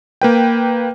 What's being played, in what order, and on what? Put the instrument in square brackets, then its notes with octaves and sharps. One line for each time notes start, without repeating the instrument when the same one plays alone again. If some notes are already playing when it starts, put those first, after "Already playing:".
[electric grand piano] A#3 B4 G5